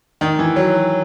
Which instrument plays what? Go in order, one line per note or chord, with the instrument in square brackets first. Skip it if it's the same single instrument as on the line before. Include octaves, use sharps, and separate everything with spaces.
[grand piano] D#3
E3
F#3